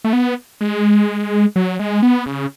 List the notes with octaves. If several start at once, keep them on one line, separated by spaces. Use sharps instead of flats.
A3
B3
G#3
F#3
G#3
B3
C#3